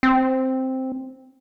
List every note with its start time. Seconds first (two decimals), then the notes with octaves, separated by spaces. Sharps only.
0.03 C4